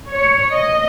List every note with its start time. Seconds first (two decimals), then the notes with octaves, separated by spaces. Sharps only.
0.11 C#5
0.53 D#5